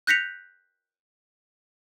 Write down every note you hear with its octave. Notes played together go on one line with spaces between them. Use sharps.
F#6 G6 A#6 B6 C#7 F7